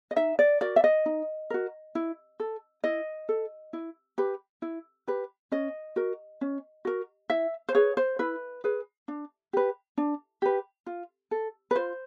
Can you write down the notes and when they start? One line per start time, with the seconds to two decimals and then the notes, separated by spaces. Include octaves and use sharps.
0.11 D#5
0.16 D#4 E5
0.39 D5
0.61 F#4 A#4 D5
0.76 E5
0.84 D#5
1.06 D#4
1.50 F#4 A#4
1.95 E4
2.40 A4
2.84 E4 D#5
3.29 A4
3.73 E4
4.18 G4 B4
4.62 E4
5.08 G4 B4
5.52 C#4 D#5
5.96 F#4 A#4
6.41 C#4
6.85 F#4 A#4
7.30 E4 E5
7.69 C5
7.75 G#4 B4 C#5
7.97 C5
8.19 E4 B4
8.64 G#4 B4
9.08 D4
9.53 G4 B4
9.98 D4
10.42 G4 B4
10.87 F4
11.31 A4
11.71 B4
11.76 F4 C5